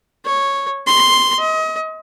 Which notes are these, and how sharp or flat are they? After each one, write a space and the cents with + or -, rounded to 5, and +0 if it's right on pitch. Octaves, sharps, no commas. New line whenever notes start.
C#5 -5
C6 +0
D#5 +35